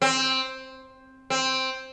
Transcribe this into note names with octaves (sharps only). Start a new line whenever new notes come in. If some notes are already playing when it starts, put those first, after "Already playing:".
C4
C4